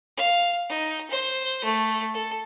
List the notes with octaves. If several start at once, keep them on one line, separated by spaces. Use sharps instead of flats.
F5
D#4
C5
A3
A4